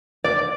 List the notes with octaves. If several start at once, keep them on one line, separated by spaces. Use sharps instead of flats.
D5